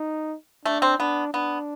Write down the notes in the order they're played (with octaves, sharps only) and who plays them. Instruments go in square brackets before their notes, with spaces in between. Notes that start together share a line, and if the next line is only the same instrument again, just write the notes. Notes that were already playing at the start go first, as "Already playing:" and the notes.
Already playing: [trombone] D#4
[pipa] A3 [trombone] D4
[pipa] C4
[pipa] B3 [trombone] D4
[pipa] B3 [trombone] D4